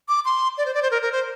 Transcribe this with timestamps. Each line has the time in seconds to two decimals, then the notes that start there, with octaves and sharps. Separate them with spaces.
0.08 D6
0.25 C6
0.58 D5
0.66 C5
0.74 D5
0.82 C5
0.91 A#4
1.02 A#4
1.12 C5